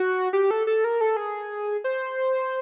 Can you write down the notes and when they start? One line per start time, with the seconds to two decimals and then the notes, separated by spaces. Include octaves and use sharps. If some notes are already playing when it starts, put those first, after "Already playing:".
Already playing: F#4
0.33 G4
0.51 A4
0.67 A4
0.84 A#4
1.01 A4
1.17 G#4
1.84 C5